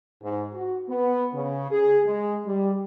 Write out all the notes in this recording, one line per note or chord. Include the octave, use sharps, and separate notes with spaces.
G#2
F#4
B3
C#3
G#4
G#3
G3